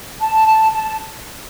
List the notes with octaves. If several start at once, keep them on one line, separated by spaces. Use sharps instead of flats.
A5
A5
A5